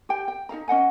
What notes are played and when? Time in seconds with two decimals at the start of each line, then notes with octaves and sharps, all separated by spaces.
0.09 G4 G5 G#5
0.28 G5
0.49 D#4 G#4 F5 A#5
0.68 C#4 D#5 F#5 G#5